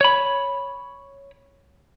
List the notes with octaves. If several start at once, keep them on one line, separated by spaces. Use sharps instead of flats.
C#5 B5